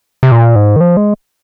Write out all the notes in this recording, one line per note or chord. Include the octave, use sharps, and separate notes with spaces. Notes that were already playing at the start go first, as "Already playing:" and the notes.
C3
A#2
G#2
D#3
F3
G#3